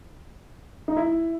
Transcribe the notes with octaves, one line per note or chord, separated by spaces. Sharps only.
D#4
E4